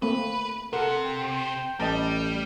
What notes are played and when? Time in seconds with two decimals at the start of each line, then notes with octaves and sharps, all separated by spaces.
0.02 A3 A#3 C4 B4
0.73 C3 A4 A#4 F#5
1.04 G5
1.80 A1 G3 D#5 A5 A#5